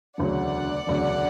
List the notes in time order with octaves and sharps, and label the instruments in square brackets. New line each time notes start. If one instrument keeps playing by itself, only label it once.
[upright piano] E1 D2 C#3 F#3 [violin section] D5 F#5
[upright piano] E1 D2 C#3 F#3